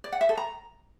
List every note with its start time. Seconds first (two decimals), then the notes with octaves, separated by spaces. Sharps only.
0.04 D5
0.12 F#5
0.21 E5
0.29 A4
0.37 A#5